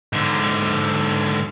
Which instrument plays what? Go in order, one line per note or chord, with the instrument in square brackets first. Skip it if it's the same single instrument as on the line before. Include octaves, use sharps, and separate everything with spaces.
[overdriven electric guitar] G#2 D3